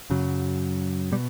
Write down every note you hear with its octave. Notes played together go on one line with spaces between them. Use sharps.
F#2 C#3 F#3
B2 G3